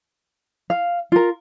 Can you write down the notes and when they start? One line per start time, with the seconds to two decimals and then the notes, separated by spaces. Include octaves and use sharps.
0.70 F5
1.12 F4 A#4